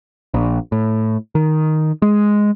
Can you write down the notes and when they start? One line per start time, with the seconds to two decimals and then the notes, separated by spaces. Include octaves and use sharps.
0.34 A#1
0.72 A2
1.35 D#3
2.02 G#3